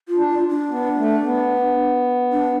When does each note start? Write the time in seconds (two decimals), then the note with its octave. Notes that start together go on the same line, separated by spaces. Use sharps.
0.08 F4
0.16 D4
0.30 F4
0.50 D4
0.70 B3
0.97 A3
1.24 B3
2.32 D4